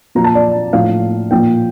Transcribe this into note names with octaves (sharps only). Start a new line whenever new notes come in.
A#2 F3 A#5
A5
D5
A2 F3 F5
A#2 F3 G5